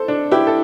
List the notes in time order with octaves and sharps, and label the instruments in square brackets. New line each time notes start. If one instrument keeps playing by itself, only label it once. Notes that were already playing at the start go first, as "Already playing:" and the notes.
Already playing: [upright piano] A4 C5
D4
E4 G4
A4